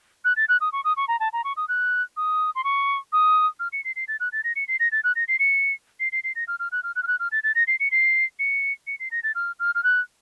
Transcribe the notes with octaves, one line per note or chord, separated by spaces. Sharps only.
F#6
A6
F#6
D#6
C#6
D#6
C#6
A#5
A5
A#5
C#6
D#6
F#6
D#6
C6
C#6
D#6
F6
C#7
C7
C7
A6
F#6
A6
A#6
C#7
C7
A#6
A6
F#6
A#6
C7
C#7
C7
C7
C7
A#6
F6
F6
F#6
F6
F#6
F6
F#6
F6
A6
A6
A#6
C7
C#7
C7
C#7
C#7
C7
A#6
A6
F6
F6
F6
F#6